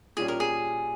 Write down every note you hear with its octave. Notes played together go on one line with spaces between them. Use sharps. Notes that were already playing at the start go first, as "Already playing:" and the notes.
A#2 G3 C#4 G4 G#4
A#4
G#4